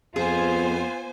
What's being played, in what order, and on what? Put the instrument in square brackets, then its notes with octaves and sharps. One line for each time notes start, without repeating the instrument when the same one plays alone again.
[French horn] F2 [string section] B3 C5 G#5 [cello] F4 [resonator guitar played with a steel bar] G#4